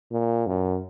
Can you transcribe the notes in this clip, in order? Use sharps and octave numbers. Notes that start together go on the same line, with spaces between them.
A#2
F#2